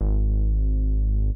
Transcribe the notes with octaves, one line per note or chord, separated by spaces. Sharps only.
G#1